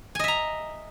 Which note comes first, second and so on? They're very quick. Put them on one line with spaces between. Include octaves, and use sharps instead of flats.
G#5 D#5 E5 A#5